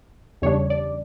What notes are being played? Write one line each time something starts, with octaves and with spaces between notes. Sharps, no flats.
E2 C#3 G3 D4 C#5
D5